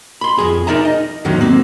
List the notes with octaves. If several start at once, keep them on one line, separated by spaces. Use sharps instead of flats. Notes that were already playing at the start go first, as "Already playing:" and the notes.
B5 C6
F2 G#4
D#4 A#4 D5 E5 A#5
D#5
E2 G#2 D3 D#3 F#3
A#3 C4